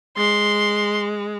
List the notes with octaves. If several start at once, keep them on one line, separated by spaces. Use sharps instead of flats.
G#3 C6